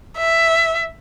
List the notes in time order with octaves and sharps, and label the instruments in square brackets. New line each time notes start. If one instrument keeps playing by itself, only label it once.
[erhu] E5